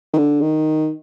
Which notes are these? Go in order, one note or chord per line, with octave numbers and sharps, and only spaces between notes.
D#3
D3
D#3